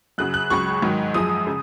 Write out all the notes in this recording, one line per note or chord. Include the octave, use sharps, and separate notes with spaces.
F#2 C#3 F#3 F#6
F#6
C#2 C#3 F#3 C#6
G#2 D#3 F#3
F#2 F3 G#3 D#6
C#3